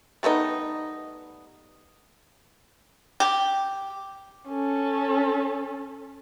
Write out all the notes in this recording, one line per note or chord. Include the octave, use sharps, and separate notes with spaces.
G3 A3 B3 D#4
G4
C#4 A4